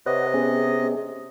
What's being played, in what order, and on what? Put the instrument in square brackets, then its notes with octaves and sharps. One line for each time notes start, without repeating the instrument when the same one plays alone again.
[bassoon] C3 [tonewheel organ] B4 C#5 F#5 [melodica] D#5
[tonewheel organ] B3 C#4 G#4